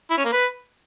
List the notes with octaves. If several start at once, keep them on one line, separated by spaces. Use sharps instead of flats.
E4
C#4
A#3
B4